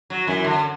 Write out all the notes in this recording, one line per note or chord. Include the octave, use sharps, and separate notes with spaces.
F#3
F#2 E3
D3